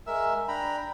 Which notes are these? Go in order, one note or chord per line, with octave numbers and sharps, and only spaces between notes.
G#3 A#4 E5 E6
D4 G5 A#5 B5